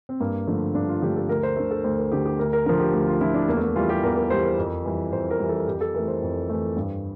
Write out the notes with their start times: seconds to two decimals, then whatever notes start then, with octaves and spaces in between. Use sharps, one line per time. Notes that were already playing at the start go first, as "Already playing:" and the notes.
0.09 C4
0.20 G2 A#3
0.47 D3 F3 A3
0.75 G2 D4
0.89 F4
1.02 D3 F3 A3 G4
1.16 A4
1.29 D2 A#4
1.43 C5
1.56 D3 A3
1.71 A4
1.84 D2 C5
1.98 A#4
2.12 D3 A3 G4
2.26 G4
2.39 D2 A#4
2.53 A#4
2.66 D3 F3 A#4
2.80 G4
2.93 D2 G4
3.07 F4
3.21 D3 F3 E4
3.34 D4
3.48 E2 A#3
3.57 A3
3.62 A#3
3.76 E3 G3 F4
3.89 G4
4.03 E2 A#4
4.17 A#4
4.30 E3 G3 C5
4.44 A#4
4.58 F2
4.85 E3 G3
5.13 F2 C5
5.31 A#4
5.40 E3 G3
5.49 A4
5.67 F2 G4
5.81 A4
5.94 E3 A3 A#4
6.08 C5
6.22 F2
6.49 E3 A3
6.76 G2